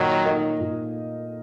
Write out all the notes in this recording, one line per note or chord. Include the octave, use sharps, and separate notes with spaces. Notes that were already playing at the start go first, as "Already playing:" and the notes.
Already playing: A#2 D#3 F#3
A#3 D#4 A#4 D#5
A#2